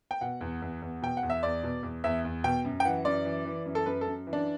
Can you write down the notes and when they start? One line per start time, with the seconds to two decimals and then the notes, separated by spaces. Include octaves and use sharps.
0.11 G5
0.21 B2 F#5
0.41 E2
0.62 E2
0.82 E2
1.02 B2 G5
1.17 F#5
1.23 E2
1.30 E5
1.43 E2 D5
1.63 B2
1.83 E2
2.04 E2 E5
2.25 E2
2.44 B2 G5
2.65 F#2
2.80 G5
2.85 E3 F#5
3.05 F#2 D5
3.25 E3
3.46 E3
3.66 F#2
3.75 A4
3.86 F#2 B4
4.01 A4
4.07 F#2
4.27 E3
4.33 D4